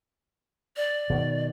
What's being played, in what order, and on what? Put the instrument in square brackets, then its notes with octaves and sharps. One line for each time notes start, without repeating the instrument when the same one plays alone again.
[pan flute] D5
[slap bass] B2 D3 D#3